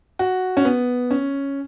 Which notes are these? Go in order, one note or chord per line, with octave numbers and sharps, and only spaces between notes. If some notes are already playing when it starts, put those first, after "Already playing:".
F#4
C#4
B3
C#4